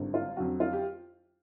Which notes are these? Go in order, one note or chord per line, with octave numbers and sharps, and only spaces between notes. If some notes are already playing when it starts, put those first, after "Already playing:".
Already playing: G#1 G2 D3
F4
F2 D3 F#3 F#4
F4
G4